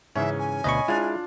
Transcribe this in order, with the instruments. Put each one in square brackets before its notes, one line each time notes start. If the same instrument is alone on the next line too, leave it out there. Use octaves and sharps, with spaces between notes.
[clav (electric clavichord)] G#2 C#3 E3 [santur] C#4 [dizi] E5
[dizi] G#5
[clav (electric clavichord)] D2 B2 [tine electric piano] D#5 B5 C#6
[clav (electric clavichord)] G#3 [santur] D4 F4 [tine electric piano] E4